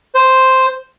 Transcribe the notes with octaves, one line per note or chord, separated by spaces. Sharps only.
C5